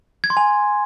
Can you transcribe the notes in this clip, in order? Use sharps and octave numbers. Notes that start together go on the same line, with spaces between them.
G#6
C6
G#5